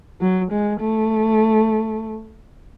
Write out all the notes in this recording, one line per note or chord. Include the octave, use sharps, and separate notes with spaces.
F#3
G#3
A3